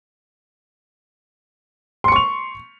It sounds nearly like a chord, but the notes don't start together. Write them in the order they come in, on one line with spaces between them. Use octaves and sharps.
C6 C#7 C#6 F7